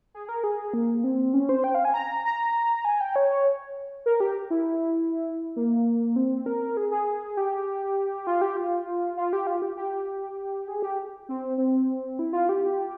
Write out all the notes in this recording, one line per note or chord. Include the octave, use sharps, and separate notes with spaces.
G#4
A#4
G#4
A#3
C4
C#4
C5
G5
F5
G#5
A#5
A#5
G#5
G5
C#5
A#4
G4
E4
A#3
C4
A#4
G#4
G#4
G4
F4
G4
F4
F4
G4
F4
G4
G4
G#4
G4
C4
C4
E4
F4
G4